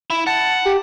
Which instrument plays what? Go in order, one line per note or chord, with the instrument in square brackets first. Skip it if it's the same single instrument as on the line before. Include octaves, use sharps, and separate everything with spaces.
[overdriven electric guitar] E4
[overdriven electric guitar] F#5 [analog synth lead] A5
[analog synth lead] G4